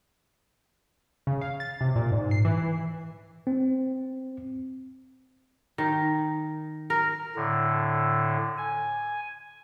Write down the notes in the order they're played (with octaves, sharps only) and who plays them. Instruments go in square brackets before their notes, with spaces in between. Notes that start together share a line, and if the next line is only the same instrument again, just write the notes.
[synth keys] C#3
F5
A6
C3
A#2
G#2
C7
E3
E3
[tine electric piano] C4
[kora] D#3
A#4
[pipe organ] A2 D3
G#5